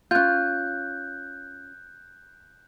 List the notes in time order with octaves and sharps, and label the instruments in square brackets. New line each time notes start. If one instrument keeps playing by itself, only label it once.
[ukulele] C#4 F4 [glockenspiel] F#6 G6